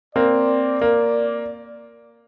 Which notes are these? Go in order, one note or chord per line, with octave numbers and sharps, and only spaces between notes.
A#3 C4 D5
A#3